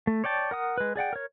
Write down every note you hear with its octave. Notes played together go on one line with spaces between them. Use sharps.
A3
C#5 D5 G5 A5
A#4 F#5 D#6
G#3 B4
G#4 D5 F#5 G5
A#4 C#5